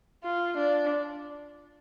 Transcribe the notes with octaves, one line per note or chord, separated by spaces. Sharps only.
F4
D4